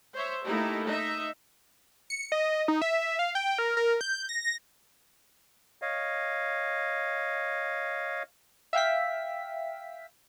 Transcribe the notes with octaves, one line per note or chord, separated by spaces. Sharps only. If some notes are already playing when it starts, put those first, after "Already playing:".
C5 C#5 E5
A3 A#3 D#4 E4 G4
D#4 D#5 E5
C#7
D#5
D#4
E5
F5
G5
A#4
A#4
G6
A#6
A#6
C#5 D#5 F5
E5 F5 G5 B6